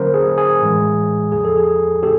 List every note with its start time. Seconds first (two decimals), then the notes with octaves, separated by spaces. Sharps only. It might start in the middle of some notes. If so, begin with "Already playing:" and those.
Already playing: D3 F#3 A#3 C#4 A#4 C5
0.14 G#4
0.38 G#4
0.62 A2 E3 G#3
1.32 E2 C#3 F3 G#4
1.45 A4
1.57 G#4
2.03 A2 A3 C#4 G4 A4